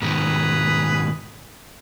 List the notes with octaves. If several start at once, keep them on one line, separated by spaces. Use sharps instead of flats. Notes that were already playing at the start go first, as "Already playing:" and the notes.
G#2 B2 D#3 G#4 B4 A#5